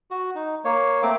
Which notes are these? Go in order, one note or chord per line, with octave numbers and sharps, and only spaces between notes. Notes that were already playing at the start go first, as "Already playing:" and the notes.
F#4
D#4
A#3 C#5
A3 A#3 C4 D6